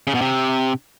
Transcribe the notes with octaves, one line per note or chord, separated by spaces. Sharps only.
C#3
B2
C3